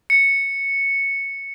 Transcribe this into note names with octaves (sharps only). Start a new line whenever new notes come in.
C#7